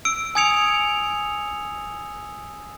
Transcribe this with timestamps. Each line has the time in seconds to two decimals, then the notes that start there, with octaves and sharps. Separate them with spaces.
0.05 E6 D7
0.35 G#5 D#6 G#6 C#7 F7